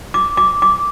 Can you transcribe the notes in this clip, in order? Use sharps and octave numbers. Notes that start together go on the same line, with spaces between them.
D6
D6
D6